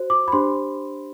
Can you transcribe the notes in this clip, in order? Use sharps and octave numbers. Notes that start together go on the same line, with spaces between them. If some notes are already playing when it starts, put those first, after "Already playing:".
Already playing: F#4 C5
D6
B5
D4 G4 C5 C6